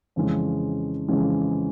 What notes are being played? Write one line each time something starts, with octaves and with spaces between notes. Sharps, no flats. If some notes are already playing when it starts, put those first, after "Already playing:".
F2 C#3 E3 G#3 C#4
F2 C#3 E3 G#3 C#4